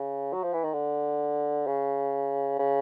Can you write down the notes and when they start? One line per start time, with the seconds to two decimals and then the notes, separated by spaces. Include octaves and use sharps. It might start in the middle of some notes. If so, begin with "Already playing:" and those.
Already playing: C#3
0.33 F#3
0.43 F3
0.53 E3
0.64 D#3
0.73 D3
1.67 C#3
2.59 C#3